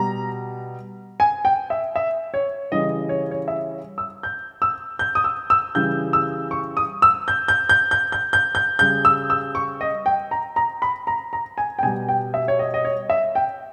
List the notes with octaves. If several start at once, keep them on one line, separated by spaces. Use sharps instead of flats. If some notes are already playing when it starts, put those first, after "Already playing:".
Already playing: B2 G3 A#5
G#5
G5
E5
E5
C#5
C#3 E3 G3 D#5
C#5
C#5
E5
E6
G6
E6
G6
D#6
E6
E6
C#3 E3 G3 G6
E6
C#6
D#6
E6
G6
G6
G6
G6
G6
G6
G6
C#3 G3 G6
E6
E6
C#6
D#5
G5
A#5
A#5
B5
A#5
A#5
G#5
G5
B2 G3 G#5
G5
E5
C#5
D#5
D#5
C#5
E5
G5